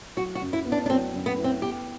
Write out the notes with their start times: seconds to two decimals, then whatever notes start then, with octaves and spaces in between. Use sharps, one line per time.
0.17 F#3 F#4
0.35 F#4
0.42 F#2
0.53 E4
0.65 B3
0.72 D4
0.86 D4
0.90 F#3 C4
1.14 F#2
1.26 B3
1.38 E4
1.44 C4
1.62 B3 G4